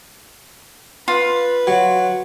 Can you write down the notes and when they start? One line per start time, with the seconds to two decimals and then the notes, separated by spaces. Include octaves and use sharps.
1.08 F4 B4
1.67 F#3